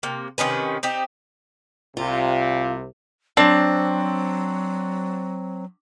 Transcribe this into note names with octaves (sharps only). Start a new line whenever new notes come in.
C3 A#3
C3 D#3 C#4 B4
C4 D#4 G4
C2 C3 F4
F#3 C4 D4